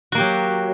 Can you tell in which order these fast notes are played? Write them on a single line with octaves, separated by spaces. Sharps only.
F#4 A#3 G4 F#3